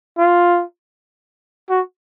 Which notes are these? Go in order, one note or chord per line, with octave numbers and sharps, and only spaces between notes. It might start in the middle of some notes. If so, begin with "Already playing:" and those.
F4
F#4